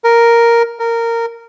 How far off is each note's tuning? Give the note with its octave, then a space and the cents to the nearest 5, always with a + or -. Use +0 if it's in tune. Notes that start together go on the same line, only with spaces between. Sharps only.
A#4 +0
A#4 -15